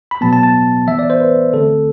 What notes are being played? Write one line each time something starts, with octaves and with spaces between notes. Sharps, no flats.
B5
B2 F#3 B3 A5
A5
A5
E3 B3 E5
D5
C5
B4
D3 A3 C4 A4